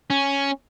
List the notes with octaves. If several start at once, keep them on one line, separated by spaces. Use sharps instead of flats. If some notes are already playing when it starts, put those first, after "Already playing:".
C#4